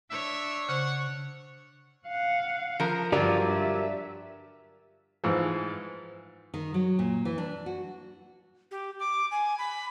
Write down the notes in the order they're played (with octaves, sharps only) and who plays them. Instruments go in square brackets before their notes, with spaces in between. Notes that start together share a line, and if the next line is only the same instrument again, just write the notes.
[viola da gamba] D4 C#5 [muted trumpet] E5
[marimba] C#3 C5 C#6 [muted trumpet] F#5
[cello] F5 F#5
[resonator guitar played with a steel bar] F3 A#4
[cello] G2 F3 [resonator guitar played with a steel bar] D3 F#3 F4 [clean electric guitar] G4 A#4 D5
[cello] E5
[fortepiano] G#2 E3 F3
[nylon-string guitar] D#3
F#3
A#2
E3
D4
F#4
[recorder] G4
D6
G#5
B5